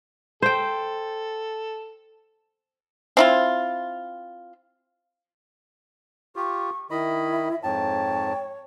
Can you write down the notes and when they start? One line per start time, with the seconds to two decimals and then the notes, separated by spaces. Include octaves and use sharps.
0.42 A4 C5 G5
3.17 C4 E4 F4
6.36 F4 G4 C#6
6.91 D#3 E4 D#5 E5 B5
7.63 F2 G#2 C#5 G5 A5